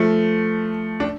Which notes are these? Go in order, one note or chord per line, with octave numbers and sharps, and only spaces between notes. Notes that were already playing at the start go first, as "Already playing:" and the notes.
Already playing: F3 A3
D4